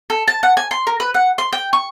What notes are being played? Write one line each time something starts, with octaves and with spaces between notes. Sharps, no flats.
A4
A5
F#5
G#5
C6
A#4
B4
F#5
C6
G5
C#6